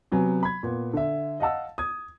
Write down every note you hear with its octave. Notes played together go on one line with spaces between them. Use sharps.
C3 F#3 B3 G#5
B5 G#6
A#2 B3
D3 E5
D#5 F5 F#5 A5 E6
D#6 G#6